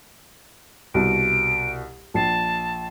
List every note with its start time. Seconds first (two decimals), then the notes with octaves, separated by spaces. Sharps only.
0.94 C2 B2 D7
2.14 A#1 A5 C7